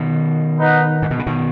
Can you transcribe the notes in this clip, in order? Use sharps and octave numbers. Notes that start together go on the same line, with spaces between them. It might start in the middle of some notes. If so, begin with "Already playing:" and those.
Already playing: B2 D#3
D#4 B4 F#5
G#2
B2
C#3
B2 D#3